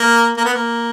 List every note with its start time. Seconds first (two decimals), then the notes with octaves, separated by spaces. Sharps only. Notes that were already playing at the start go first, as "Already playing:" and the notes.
Already playing: A#3
0.37 A#3
0.45 B3
0.54 A#3